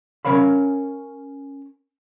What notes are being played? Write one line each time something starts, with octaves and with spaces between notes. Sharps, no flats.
C#4 A#4 C#5 F5 B5